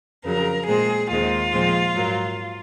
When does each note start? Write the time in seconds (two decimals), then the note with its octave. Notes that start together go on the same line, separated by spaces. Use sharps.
0.25 F2 C#3 F#3 A#4
0.67 A#2 G#3 C4 G#4
1.10 D#2 D#3 G#3 C4 F4
1.53 A#2 F3 G#3 C4
1.94 G#2 F#3 A#3